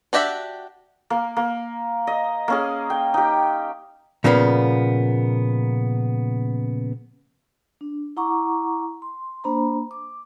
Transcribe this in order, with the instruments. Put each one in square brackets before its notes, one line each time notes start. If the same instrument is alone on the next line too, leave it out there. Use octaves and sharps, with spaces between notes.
[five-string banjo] D4 F#4 G4 E5 F#5
[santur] A#3
A#3
D#5
A#3 C#4 G#4
G5
D#4 G4
[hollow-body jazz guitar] A#2 C#3 F3 A#3 B3
[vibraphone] D4
E4 F#5 A#5 C#6 D6
C6
A#3 D4 C5 A#5 B5
D6